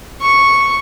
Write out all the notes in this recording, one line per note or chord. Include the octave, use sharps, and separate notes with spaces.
C#6